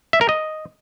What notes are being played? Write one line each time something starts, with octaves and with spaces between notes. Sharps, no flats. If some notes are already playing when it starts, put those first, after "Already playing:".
E5
A#4
D#5